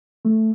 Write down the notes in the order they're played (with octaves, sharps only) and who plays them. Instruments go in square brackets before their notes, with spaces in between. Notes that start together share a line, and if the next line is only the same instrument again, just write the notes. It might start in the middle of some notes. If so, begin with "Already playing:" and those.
[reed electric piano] A3